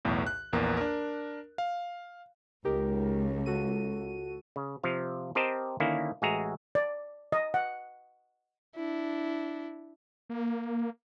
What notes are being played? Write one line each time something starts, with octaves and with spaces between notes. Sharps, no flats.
B1 E2 A2
F#6
A#1 E2 A#3
D4 A#4
F5
C#2 D#4 G4 A#4
F#4 A4 D#7
C#3
C3 F3 F5
C4 G4 A#4 C5 D#5 A5
D3 D#3 A#3 C#4 E4
A1 G#3 F#4 G#4 E5 A#5
D5
D#5
F#5
D4 E4
A#3